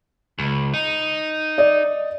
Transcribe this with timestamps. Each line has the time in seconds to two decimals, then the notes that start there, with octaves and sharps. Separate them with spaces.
0.39 C#2
0.74 D#4
1.58 D5 D#5